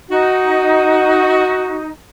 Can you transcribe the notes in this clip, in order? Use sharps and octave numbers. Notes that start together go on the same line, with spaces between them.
D#4 F#4